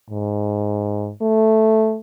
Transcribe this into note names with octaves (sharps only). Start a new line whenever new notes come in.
G#2
A3